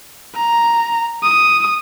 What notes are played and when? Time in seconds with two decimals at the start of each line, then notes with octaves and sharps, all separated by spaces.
0.35 A#5
1.23 D#6